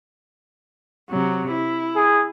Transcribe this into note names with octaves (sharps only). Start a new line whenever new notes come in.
C3 F#3
E4
G#4